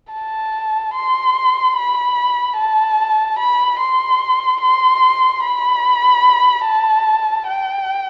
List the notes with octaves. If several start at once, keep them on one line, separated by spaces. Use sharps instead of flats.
A5
C6
B5
A5
B5
C6
C6
B5
A5
G5